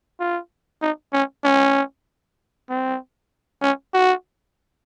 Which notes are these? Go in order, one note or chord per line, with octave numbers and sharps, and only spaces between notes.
F4
D#4
C#4
C#4
C4
C#4
F#4